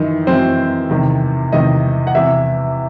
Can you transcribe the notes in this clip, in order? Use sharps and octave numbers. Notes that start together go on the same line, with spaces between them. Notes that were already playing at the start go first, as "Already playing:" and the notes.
Already playing: F#2 D#3 E3 D#4
F#2 E3 C4 C5
E2 C3 D#3
E2 C3 D#3 D#4 D#5
F#5
E2 C3 E3 E4 E5